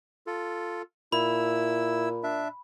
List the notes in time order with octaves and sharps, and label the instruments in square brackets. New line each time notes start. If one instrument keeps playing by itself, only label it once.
[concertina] F4 A4
[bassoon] A#2 [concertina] E4 E6 [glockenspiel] B5
[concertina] D4 E5